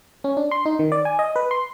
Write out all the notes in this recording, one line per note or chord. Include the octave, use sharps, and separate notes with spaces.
C#4
D4
C6
D#4
D#3
D5
G#5
D#5
B4
C6